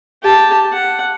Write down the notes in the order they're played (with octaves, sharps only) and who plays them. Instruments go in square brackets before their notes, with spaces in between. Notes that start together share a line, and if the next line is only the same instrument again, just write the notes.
[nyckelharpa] G4 A5
F#5